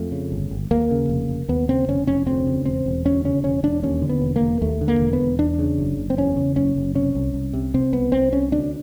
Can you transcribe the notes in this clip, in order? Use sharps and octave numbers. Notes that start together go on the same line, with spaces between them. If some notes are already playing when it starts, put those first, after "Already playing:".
Already playing: F2 A3
C#3
G1
G1
D#2 A#3
C#3
F1
F1
D#2 B3
C#3 C4
F1 C#4
F1 C#4
D2 C4
C#3
E1 C4
E1
D2 C#4
C#3 C#4
E1 C#4
E1 D4
D#2 C#4
D3
B3
E1
A#3
E1
D#2 A3
D3
A#3
E1
B3
E1
E2 D4
C#3
F#1
F#1
C4
E2 C#4
C#3
F#1 C#4
F#1
C3 C#4
C2
C2
C3
C3 C4
C2 B3
C2 C4
C3 C#4
D2 D4